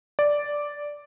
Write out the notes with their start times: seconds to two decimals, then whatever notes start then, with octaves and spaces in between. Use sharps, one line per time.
0.19 D5